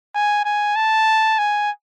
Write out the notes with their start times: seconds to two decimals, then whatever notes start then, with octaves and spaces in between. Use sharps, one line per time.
0.15 G#5
0.45 G#5
0.76 A5
1.38 G#5